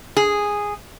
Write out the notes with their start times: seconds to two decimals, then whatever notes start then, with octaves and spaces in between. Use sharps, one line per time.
0.17 G#4